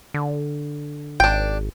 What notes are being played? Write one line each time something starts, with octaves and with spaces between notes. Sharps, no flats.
D3
G#1 D4 G5